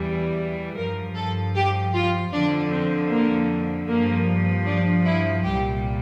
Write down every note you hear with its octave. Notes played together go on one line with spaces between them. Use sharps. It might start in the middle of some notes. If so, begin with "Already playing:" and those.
Already playing: E2 E3 G3
G2 F3 A#4
A4
G4
F4
F2 D3 F3 D4
C4
A#3
G2 F3 A#3
D4
E4
C2 A#2 G3 G4